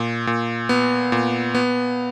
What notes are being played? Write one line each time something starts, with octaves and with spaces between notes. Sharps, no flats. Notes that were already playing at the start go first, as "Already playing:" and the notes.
Already playing: A#2
A#2
B3
A#2
B3